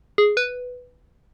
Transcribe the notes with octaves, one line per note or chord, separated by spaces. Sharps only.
G#4
B4